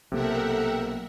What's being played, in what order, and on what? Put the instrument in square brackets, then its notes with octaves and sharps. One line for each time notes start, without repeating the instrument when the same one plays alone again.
[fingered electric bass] B1 A#3 [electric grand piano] C3 [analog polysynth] A4 G5 [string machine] A#4 E5 F#5